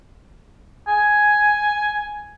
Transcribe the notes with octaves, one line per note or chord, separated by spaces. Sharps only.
G#5